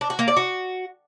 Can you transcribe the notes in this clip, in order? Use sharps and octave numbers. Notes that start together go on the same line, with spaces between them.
D4
F#4
A#3
D5
F#4